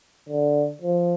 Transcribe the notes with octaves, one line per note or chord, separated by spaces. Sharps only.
D3
F3